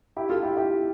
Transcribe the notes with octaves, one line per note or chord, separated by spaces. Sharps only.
E4 G4
F4 A4
E4 G4
E4 G4